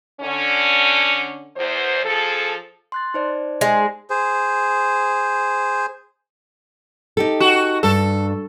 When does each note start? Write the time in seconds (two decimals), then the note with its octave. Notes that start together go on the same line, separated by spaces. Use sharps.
0.21 D3 C#4
1.57 E2 C5
2.05 F3 G#4 A4
2.92 C6 F#6 A6
3.14 D#4 C5 D5
3.61 G#3
4.10 G#4 C5
7.17 D#4 G4 A4
7.40 F#4
7.83 G2 A4